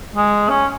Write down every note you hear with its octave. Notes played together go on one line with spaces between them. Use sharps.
G#3
C#4